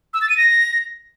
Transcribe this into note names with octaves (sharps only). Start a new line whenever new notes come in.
E6
A6
D#7
A#6